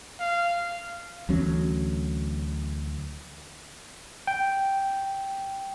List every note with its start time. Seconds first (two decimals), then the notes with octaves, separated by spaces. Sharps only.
0.20 F5
1.29 D2 E3 F#3 C#4
4.27 G5